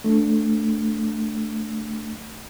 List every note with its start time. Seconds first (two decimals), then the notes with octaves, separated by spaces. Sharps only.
0.04 A3 D4